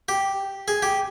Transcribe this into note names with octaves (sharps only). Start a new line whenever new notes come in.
G4
G#4
G4